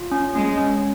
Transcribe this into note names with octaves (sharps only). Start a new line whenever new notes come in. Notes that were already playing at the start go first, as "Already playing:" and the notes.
Already playing: F4
C#4
G#3 C#4
C#4